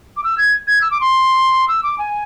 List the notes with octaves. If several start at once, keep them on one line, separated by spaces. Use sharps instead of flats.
D6
E6
G#6
G#6
E6
D6
C6
E6
D6
G#5